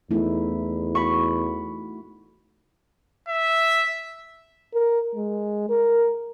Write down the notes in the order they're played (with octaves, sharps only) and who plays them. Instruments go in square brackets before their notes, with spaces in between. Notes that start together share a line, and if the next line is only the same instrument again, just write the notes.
[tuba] E2 [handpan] A3 D#4 E4
[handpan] F#4 [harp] B5 C#6
[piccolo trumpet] E5
[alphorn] A#4
G#3
A#4